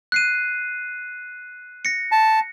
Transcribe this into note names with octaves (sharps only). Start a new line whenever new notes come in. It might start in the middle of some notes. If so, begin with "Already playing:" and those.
F#6 C7 D#7
A#6 C#7
A5